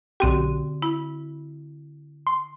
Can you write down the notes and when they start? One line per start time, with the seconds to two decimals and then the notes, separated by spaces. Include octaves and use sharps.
0.20 B1 D3 C4 F#4 G4
0.82 E4 B5
2.27 C6